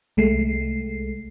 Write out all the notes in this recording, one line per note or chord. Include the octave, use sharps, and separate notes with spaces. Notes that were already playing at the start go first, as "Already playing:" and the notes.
C2 G#3 A3 C7